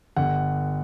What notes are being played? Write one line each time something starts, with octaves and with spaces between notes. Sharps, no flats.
G1 F#5